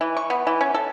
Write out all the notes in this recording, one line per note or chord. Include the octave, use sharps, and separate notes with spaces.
E3
C#6
B3
E3
C#4
A4